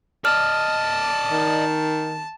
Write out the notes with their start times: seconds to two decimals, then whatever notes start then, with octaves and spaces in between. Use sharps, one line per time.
0.25 D5 D#5 A5 F6
1.31 D#3